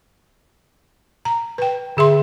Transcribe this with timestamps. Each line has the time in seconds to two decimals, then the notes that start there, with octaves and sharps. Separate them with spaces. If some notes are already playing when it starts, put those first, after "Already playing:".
1.25 A#5
1.58 B4 G5
1.97 D3 G#4 E5 C6